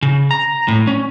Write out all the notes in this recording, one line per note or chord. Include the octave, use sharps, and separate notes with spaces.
C#3
A#5
A2
C#4